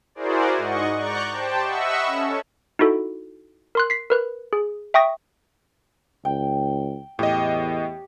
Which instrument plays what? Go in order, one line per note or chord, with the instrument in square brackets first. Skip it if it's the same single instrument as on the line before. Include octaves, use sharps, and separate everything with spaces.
[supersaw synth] E4 F#4 G#4 A#4 C5 D5
G#2 D#5 F#5 C#6
D5 A#5 C#6 F#6 G6
G4 C5 G5 A5
D#5 E5 F#5 B5 C#6 E6
C#4 A4
[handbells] D#4 E4 F#4 A4
A#4 C6 F#6
B6 C7
A#4 B4 F#6
G#4
E5 G5 C#6 D#6 A#6
[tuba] C#2 [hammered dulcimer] G5
[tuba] E2 [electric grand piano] A2 D#5 [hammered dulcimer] G4